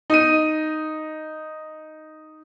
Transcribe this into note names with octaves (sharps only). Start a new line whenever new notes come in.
D#4 D#7